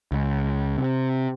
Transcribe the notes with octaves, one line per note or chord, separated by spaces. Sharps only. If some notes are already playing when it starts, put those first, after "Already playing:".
C#2
C3